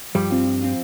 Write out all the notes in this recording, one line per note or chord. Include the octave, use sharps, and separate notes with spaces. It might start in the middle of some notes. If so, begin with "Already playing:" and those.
G2 F3 G3
C4 F4
F3
C4 F4